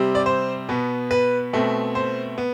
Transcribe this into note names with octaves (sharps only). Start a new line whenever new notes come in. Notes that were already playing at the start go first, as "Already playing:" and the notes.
Already playing: C3 G3 C4
D5
C5
B2 B3
B4
B2 A3 C4
C5
B3